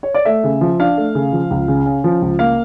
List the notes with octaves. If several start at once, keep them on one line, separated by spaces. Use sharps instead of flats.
C#5
D5
A3 E5
C#3
F3
D4 F5
A3
C#3
F3
C#2
C#3
C#4
F3
C#2
A#3 F5